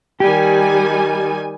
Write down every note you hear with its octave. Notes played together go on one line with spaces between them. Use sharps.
D#3 G3 G4 G#5